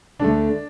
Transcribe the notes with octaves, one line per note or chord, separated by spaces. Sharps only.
D2 D3 A3 D4